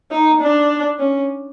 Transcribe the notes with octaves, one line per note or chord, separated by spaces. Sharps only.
D#4
D4
C#4